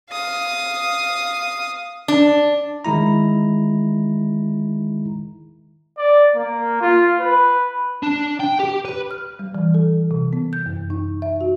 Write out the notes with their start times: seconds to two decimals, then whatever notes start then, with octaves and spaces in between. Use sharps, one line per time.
0.10 F5 D#6
2.08 D4
2.85 D#3 G#3 E4 A#5
5.98 D5
6.36 A#3
6.82 F4
7.20 B4
8.03 D4
8.40 G5
8.60 G4
8.85 B4
9.11 F6
9.39 G3
9.55 E3
9.74 A4
10.11 C3
10.33 B3
10.53 G6
10.66 F#2
10.90 D#4
11.22 E5
11.41 F#4